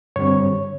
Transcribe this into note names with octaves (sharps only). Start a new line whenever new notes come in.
G2 D3 G3 C4 C#5